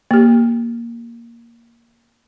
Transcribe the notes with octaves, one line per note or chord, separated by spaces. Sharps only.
A#3 G4